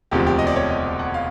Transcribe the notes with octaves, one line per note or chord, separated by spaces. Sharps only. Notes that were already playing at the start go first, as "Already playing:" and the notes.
E1 D2 C3 F3 G4
G4
D#5
D5
C#5
D#5
F#5
F5